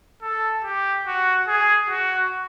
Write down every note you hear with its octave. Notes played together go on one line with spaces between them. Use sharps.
A4
G4
F#4
G#4
F#4